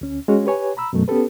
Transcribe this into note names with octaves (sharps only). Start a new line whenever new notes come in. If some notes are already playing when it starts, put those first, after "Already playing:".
D2 C#4
G#3 C#4 F#4 G#4 C#5
G4 B4 C#5 G#5
A#5 B5 E6
F#2 B2 F#3 A3
B3 C#4 G4 A4 B4